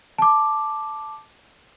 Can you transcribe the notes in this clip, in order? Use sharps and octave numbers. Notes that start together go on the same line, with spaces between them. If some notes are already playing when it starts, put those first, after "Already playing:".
A5 D6